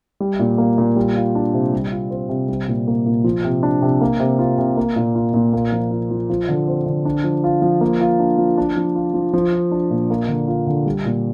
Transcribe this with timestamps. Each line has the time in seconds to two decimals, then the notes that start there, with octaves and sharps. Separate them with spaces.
0.20 G3
0.39 A#2
0.58 A#3
0.78 A#2
0.96 G3
1.16 F4
1.35 D4
1.54 C3
1.73 G3
1.92 F4
2.11 C4
2.29 C3
2.49 G3
2.68 A#2
2.87 A#3
3.06 A#2
3.24 F3
3.45 C3
3.63 D4
3.82 C3
4.01 A#3
4.20 C3
4.39 F4
4.58 C3
4.77 A#3
4.96 A#2
5.15 F4
5.34 A#2
5.53 A#3
5.72 F3
5.91 F4
6.11 F3
6.30 F3
6.49 D3
6.68 C4
6.86 D3
7.05 D4
7.24 F3
7.44 F4
7.62 F3
7.81 A#3
8.01 F4
8.19 D4
8.38 F3
8.57 D4
8.76 F3
8.96 F4
9.14 F3
9.33 F3
9.52 F4
9.71 D4
9.90 A#2
10.10 A#3
10.28 D3
10.48 F4
10.67 D3
10.86 G3
11.05 A#2